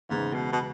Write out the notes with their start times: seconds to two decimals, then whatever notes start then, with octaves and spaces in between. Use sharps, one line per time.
0.09 E2 G#2 C#3 G#3 B3
0.34 B2
0.53 B2